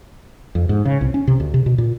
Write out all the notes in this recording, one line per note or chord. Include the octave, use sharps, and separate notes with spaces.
F2
G#2
C#3
C2
C#4
C3
D2
C3
B2
A#2